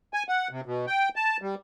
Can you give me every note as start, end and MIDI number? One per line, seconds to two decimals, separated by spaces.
0.14 0.23 80
0.29 0.48 78
0.51 0.61 48
0.66 0.86 47
0.87 1.09 79
1.16 1.37 81
1.42 1.55 55